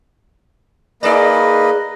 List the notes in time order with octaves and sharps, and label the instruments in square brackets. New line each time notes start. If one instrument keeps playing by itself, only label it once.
[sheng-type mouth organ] A#3 B4 D#5 [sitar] D#4 G#4 D5